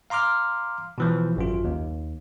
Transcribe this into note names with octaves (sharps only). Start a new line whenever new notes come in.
F5 A#5 C6 D6 F6
B2 E3 F3
G#1 F#2 F4
D#2